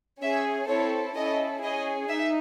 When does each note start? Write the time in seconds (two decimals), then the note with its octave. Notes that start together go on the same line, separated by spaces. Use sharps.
0.21 C#4 G#4 E5
0.68 C4 E4 A4 C#5
1.15 C#4 E4 A4 D#5
1.62 C#4 G#4 D#5
2.09 D#4 E5